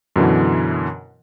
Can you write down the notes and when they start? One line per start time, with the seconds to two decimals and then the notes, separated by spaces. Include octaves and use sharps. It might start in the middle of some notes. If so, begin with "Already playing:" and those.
0.16 F#2 B2 D3 E3